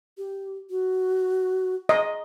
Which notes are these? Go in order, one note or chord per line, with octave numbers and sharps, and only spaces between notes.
G4
F#4
D#5